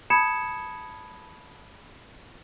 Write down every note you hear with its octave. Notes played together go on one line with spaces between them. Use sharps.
A5 B5 D#6 G#6 C#7 E7